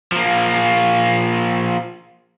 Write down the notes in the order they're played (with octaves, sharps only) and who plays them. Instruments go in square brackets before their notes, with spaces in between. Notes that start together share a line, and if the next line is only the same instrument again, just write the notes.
[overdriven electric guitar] F3 A#3